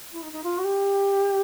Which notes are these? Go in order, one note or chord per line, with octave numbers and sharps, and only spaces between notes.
E4
D#4
D#4
F4
F#4
G4